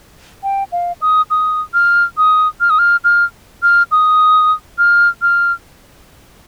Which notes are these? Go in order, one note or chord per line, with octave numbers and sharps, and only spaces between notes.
G5
F5
D#6
D#6
F6
D#6
F6
D#6
F6
F6
F6
D#6
F6
F6